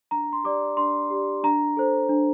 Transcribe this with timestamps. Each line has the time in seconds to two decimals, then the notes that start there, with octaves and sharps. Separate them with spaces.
0.11 D4 A#5
0.33 C6
0.44 G4 D5 D6
0.77 D4 C6
1.10 G4 D5
1.44 D4 A#5
1.77 A4 C5
2.09 D4